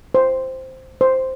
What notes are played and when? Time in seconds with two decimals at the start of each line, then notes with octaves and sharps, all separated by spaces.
0.15 C5
1.01 C5